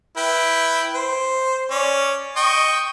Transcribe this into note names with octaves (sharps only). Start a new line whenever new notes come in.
E4 B4 G5
C5
C#4 D5
D#5 G5 C#6